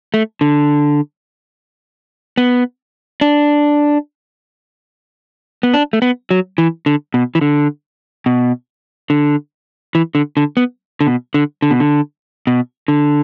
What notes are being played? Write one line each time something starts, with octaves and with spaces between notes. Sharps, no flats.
A3
D3
B3
D4
B3
D4
A3
B3
F#3
E3
D3
B2
E3
D3
B2
D3
E3
D3
D3
B3
D3
B2
D3
D3
B2
D3
B2
D3